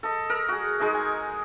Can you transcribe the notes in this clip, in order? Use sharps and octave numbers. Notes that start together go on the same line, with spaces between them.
A4 D#5
A#4
F#4 G#4
G#3 D#4 G#4 D#5
G#5